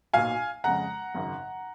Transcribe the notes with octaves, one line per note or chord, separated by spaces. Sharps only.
B1 A#2 F#3 F5 G#5
F2 C#3 G#3 F#5 A#5
G#1 F#2 C#3